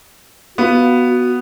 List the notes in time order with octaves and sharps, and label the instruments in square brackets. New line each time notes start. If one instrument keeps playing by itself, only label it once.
[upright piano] B3 F4 [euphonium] F#4